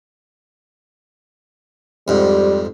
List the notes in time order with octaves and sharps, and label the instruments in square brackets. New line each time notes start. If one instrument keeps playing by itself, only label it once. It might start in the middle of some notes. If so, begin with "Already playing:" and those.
[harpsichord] F2 G#2 [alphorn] G3